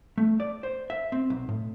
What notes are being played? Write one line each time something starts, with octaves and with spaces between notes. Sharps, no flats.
A3
D5
C5
E5
C4
B1
A2